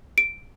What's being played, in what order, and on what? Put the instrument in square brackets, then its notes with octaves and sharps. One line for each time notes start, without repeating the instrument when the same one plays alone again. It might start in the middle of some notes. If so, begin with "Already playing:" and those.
[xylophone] D7